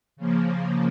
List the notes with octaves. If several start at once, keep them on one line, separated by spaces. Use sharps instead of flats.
C#3 F3 A#3